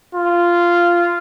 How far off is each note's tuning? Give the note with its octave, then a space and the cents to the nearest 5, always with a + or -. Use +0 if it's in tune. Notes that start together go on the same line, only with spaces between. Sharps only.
F4 -10